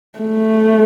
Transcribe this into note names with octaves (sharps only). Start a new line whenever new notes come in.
A3